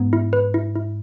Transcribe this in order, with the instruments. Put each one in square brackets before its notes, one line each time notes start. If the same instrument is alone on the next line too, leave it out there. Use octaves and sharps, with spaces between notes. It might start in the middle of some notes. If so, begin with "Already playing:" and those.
Already playing: [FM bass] G#2 [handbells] B3
[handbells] E4
B4
E4
E4